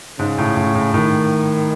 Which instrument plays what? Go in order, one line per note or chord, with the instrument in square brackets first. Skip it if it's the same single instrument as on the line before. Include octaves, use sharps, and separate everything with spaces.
[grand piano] G#2 [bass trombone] C#3
[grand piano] A2
A2
A2
[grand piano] A2 [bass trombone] D#3